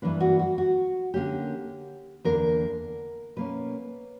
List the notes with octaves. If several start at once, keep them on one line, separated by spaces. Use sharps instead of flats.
G2 E3 A#3 D4 B4
F#4
F#4
F#4
D3 A#3 C#4 G4
E2 D3 A#3 A#4
B2 A#3 C#4 B4